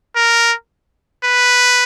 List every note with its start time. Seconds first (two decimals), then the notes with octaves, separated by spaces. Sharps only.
0.16 A#4
1.24 B4